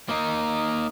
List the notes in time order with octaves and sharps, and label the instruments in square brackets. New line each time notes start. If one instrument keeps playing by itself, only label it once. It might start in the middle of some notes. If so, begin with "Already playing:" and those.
[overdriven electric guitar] A#3 D#4